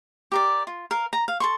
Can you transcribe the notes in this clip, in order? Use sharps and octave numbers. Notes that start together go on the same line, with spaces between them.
G4 A#4 D5
F4
A#4 F5
A#5
F5
A4 C6 C#6